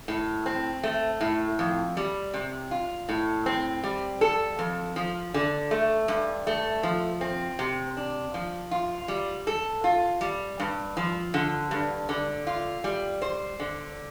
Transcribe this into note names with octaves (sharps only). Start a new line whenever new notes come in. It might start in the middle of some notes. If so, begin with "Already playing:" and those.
A2
C4
A3
A2
F2
G3
C3
F4
A2
C4
G3
A4
F2
F3
D3
A3
G2
A3
F3
C4
C3
D4
F3
F4
G3
A4
F4
G3
G2
F3
D3
G2
D3
F4
G3
C5
D3